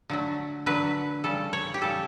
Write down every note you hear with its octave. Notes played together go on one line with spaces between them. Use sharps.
D3 F#3 A3
D3 F#3 A3 B4
C#3 G3 A4
C#5
G4
C#3 G3 A4